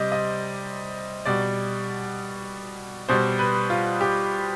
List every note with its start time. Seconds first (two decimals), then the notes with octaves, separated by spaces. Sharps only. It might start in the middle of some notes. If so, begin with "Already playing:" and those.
Already playing: C3 G3 C5 D5 D#5
0.12 D#5
1.25 B2 G3 D5
3.09 B2 G3 C5
3.39 B4
3.70 F4
4.01 G4